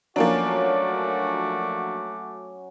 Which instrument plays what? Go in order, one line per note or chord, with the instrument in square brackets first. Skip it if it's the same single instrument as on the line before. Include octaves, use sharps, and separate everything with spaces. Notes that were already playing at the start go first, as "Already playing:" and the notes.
[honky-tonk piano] F3 A#3 D4 [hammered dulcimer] F#3 C#4 [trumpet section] A3 F#4 D6